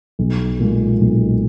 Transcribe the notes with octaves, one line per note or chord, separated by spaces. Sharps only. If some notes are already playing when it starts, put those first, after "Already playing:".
B1
A#2 G#3
B1